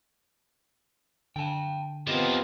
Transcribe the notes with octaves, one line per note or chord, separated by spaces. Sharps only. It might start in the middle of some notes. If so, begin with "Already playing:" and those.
D3 G5 A5
F3 B3 C4 E4 F4 G4 A#4 D#5